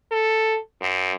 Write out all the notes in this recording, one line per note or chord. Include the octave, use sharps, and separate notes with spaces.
A4
F#2